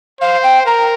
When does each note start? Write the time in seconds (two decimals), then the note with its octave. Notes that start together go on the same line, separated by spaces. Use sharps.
0.21 C5 F5
0.43 G5
0.66 A#4 A#5